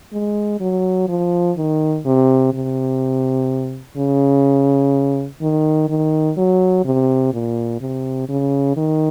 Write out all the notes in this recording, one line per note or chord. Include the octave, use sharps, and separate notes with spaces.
G#3
F#3
F3
D#3
C3
C3
C#3
D#3
D#3
F#3
C3
A#2
C3
C#3
D#3